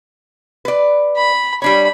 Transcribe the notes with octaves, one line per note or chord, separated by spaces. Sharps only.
B4 D5
B5
G3 D4 C#5 B5